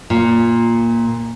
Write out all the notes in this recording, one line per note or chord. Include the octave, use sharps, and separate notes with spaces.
A#2